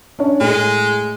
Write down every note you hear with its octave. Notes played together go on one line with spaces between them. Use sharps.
C#4 D4 C#5
A2 G#3